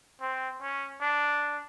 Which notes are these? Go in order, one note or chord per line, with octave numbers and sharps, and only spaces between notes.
C4
C#4
D4